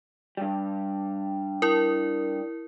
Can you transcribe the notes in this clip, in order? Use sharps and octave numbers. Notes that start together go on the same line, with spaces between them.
G2 G3
E4 A#4